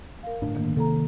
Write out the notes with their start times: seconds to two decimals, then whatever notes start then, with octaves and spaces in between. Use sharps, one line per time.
0.23 A#4 F5
0.41 G1 A2 D4
0.55 D#3 A#3
0.76 C3 D#3 A#3 A4 A#5